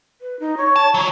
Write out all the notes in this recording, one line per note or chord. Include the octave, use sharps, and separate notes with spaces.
B4
D#4
C#5
A5
D#3 F#3 C#5